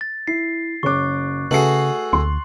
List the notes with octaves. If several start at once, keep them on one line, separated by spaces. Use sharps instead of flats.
A6
E4 C7
F#1 C#4 C#6 D6 F#6
C#3 A3 F#4 G#4 B4 C7 F#7
D2 C6